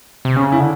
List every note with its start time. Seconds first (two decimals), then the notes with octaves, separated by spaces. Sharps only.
0.25 C3
0.36 C#3 C#4
0.52 E4
0.60 D3